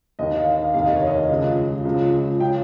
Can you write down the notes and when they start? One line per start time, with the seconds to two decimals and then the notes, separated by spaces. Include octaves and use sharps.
0.19 D#2 D#3 D#5
0.37 F5
0.56 F5
0.74 F1 D#2 D#3 F5
0.85 D#5
0.96 C#5
1.07 D#5
1.29 C#2 C#3 F3
1.85 C#2 C#3 F3
2.40 C#3 F3 G5